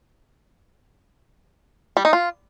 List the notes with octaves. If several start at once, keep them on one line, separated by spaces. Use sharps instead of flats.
G3
D#4
F4